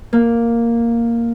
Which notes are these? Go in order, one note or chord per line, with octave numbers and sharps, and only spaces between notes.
A#3